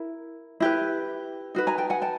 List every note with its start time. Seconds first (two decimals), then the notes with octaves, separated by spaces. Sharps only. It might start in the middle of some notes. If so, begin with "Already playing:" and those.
Already playing: E4 A#4
0.60 E4 G4 B4
1.55 D#4 F#4 B4
1.67 G#5 A#5
1.78 G5 A5
1.90 F#5 G#5
2.02 G5 A5